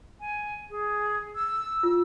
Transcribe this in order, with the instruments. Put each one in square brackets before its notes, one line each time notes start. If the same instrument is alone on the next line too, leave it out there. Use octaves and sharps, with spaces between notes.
[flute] G#5
G#4
E6
[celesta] F4